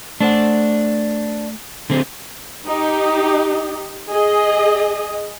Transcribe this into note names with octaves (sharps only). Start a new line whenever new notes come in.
A3 D4 C5 F#5
D3 C4
D#4 G4
G#4 D#5